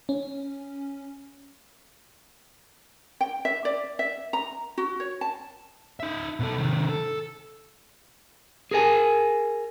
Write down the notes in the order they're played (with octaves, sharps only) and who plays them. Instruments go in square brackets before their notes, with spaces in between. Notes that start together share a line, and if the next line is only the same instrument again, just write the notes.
[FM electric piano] C#4
[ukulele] G5
E5
D5
E5
A#5
F#4
C#5
A5
[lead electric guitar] D#4 E5
B2 A4
C3 D#3
A4
[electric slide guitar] G#4 A#4 G#5